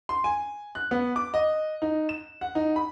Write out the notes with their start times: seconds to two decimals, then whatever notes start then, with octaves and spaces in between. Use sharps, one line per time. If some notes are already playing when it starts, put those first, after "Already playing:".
0.09 C6
0.24 G#5
0.75 F#6
0.91 B3
1.16 D6
1.34 D#5
1.82 D#4
2.09 E7
2.41 F#5
2.55 D#4
2.76 B5